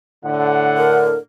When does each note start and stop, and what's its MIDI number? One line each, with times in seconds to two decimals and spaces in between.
0.25 1.18 45
0.25 1.18 50
0.25 1.10 78
0.77 1.16 70